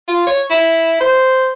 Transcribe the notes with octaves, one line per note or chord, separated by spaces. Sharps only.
F4
C#5
E4
C5